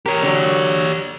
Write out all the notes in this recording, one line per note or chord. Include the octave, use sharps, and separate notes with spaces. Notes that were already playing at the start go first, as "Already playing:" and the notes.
G4 A#4 C#5
D3 F#3